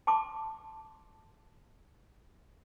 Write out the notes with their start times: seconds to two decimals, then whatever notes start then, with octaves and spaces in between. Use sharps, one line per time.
0.07 A5 C6 D6